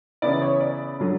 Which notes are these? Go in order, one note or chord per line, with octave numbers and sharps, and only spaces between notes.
C#3 E3 B3 E4 D5
C#5
D5
D3 F#3